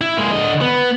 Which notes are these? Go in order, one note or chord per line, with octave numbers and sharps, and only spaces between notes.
E4
G#3 A#3
D3 D#5
B3